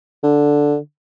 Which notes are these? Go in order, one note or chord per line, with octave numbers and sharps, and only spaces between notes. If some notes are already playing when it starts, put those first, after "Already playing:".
D3